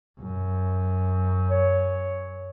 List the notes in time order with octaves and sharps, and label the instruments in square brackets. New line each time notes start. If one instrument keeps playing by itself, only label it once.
[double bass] F#2
[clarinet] C#5